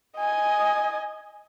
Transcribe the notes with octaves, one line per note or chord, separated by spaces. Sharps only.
D#5 G#5